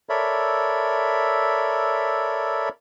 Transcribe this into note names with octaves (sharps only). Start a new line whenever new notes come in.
A4 A#4 C#5 D5 E5 B5